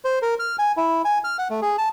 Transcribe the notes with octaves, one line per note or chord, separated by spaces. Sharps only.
C5
A#4
F6
G#5
E4
G#5
F6
F#5
A3
G#4
A5